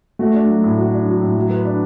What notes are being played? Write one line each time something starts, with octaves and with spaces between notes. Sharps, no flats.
A3 F#4
D4
F#3
A2
F#4
D4
F#3
A2
F#3
B4
D4